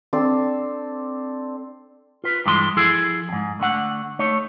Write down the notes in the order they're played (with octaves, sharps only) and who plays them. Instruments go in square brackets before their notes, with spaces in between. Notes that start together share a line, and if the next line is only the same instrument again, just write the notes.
[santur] C4 D4 A4 C6
[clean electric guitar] F4 B4
G2 E3 G#3 B5 C6
F3 E4 G#4 A4
F2 G#2
D3 A3 F#5
A3 D#4 C#5